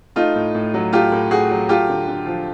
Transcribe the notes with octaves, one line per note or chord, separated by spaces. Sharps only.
A3 D#4 F4
A2
A2
F#3
A3 F4 G4
A2
A2 F#4 G#4
F#3
A3 F4 G4
D3
D3
F3